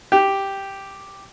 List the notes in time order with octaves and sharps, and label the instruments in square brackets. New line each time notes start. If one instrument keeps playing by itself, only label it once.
[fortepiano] G4